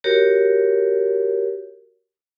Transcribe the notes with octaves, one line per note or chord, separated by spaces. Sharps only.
F#4 G4 A#4 C#5